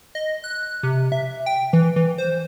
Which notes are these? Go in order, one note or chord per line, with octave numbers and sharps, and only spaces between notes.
D#5
F#6
C3
E5
G5
E3
E3
C5